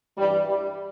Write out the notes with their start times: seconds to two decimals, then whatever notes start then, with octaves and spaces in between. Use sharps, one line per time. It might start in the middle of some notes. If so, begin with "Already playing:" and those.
0.17 G2 E3 G3
0.45 G3